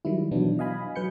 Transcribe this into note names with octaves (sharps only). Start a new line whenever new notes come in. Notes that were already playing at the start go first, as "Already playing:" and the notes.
D#3 F#3 G3 E4
B2 E3 F#3 B3 D4
D#5 F5 G#5 B5
F#3 B4 G6 C#7